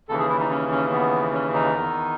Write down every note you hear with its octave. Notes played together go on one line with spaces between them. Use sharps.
D#2 C#3 E3 A4
G#4
E4
D#4
C#4
C#4
B3
C#4
D#4
E2 D#3